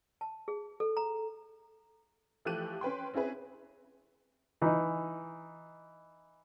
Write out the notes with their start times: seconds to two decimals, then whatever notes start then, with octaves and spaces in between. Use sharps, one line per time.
0.21 A5
0.48 G#4
0.80 A4
0.97 A#5
2.45 E3 F3 A3 G4 F#6 D#7
2.81 C#4 B4 G5 C6
3.14 C4 C#4 E4 G#4 B4
4.62 E3 D#4